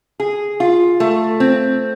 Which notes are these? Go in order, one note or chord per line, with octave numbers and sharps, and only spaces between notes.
G#4
F4
A3
C4